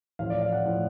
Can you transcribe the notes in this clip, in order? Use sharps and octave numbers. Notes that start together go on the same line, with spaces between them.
A1 A2 F3 F5
D5
F5
F#5
A2 F3